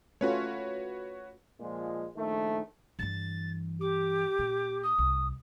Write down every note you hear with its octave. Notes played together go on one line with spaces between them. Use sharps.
A3 C#4 F4 F#4 B4 C#5
A#2 F3 G#3
A#1 D#3 A3
G2 E3 A6
G4 D6
A#2
D#6
C2